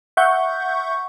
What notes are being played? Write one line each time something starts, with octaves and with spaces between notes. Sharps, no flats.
E5 F#5 C#6 G6